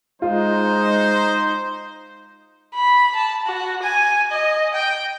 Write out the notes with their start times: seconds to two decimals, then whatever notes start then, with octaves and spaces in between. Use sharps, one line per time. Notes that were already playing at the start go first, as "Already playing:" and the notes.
0.22 G#3 D#4 F4 C5
2.75 B5
3.16 A5
3.46 F#4
3.83 G#5
4.31 D#5
4.74 G5